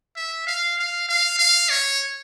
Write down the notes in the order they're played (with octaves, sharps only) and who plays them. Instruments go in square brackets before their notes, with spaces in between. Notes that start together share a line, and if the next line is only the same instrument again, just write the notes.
[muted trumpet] E5
F5
F5
F5
F5
C#5